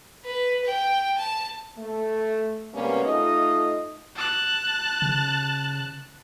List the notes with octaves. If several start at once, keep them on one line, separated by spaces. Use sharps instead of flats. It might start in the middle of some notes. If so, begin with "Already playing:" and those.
B4
G5
A5
A3
C3 G3 G#3 A#3 B3 C#4
A3 D#4 F4 D#5
A5 F#6
C#3